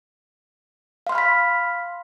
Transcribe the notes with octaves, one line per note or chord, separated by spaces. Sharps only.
F5 B5 C6 F6 B6